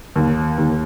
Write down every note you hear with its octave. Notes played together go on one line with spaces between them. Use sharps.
D#2
D#2